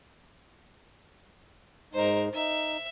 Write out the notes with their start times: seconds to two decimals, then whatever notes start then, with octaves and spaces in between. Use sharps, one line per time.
1.93 G#2 G#3 D#4 A#4 C5
2.34 D#4 E5